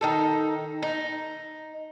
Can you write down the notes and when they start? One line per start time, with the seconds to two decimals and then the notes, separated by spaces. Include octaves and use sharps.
0.01 D#3 D#4 A4
0.82 D#4